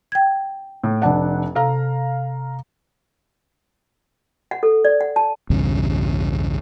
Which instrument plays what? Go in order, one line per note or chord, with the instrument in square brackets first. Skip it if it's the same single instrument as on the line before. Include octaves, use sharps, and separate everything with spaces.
[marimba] G5 G#6
[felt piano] A2
F1 D4 F#5
[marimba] C3 [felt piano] A4 F5 A#5
[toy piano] F#5
A4
D5
F#5
A5
[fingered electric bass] B1 E2 G2 C#3